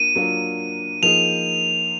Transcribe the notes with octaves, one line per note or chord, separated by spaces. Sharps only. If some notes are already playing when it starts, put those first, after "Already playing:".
Already playing: A#3 D4 F4 D#7
F#3 A#3 D4 F4
F3 A#3 D#4 G#4 F7